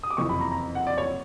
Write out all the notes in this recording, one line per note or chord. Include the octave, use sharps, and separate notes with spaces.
D#6
D6
F#1 F2 C3 E3 C#6
B5
A#5
A#5
F#5
D5
C#5